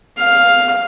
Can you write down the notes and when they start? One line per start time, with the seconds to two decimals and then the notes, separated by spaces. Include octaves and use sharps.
0.18 F5